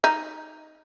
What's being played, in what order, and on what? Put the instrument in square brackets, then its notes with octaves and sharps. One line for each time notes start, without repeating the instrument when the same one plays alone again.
[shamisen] D#4